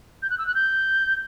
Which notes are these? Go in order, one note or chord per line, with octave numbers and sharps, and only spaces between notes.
G6
F#6
E6
F#6
G6